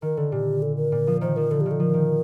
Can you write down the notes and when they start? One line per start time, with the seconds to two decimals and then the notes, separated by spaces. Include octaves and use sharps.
0.02 D#3 A#4
0.17 D3 A4
0.32 A#2 G4
0.62 A4
0.77 A#4
0.92 A#2
1.07 F3
1.21 D#3 C5
1.36 F3 A#4
1.51 D3 A4
1.61 G4
1.66 D#3
1.71 A4
1.80 F3 A#4
1.94 D#3